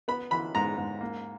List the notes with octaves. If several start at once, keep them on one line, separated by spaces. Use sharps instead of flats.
B3 B5
E3 B5
G#2 A#5
G#2
A#3